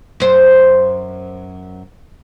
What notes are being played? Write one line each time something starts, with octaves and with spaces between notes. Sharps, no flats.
F#2 C5